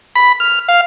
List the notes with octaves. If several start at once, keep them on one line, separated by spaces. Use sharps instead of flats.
B5
F6
F5